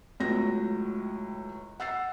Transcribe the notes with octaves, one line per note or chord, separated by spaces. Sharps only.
C#2 A2 F#3 A#6
F#5 E6 A6 C7